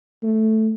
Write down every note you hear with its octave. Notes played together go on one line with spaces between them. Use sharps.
A3